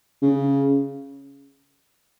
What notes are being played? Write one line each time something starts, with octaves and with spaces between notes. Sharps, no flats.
C#3